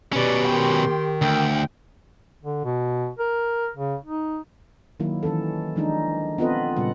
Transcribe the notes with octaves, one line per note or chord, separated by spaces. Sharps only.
B2 C#4 G4 B4 D5
D#3 G5 C6
D2 G5
D3
B2
A#4
C#3
D#4
D#3 F#3 A#3 E4
D#3 E3 C#4 A4
D#3 F3 G#3 D4 D#4
B3 C4 F4 A4 B4 D#5
A#2 C#3 G3 F#5